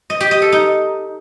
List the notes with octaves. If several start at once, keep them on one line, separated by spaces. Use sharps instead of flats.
D#5
G4
D#5
A4
D#4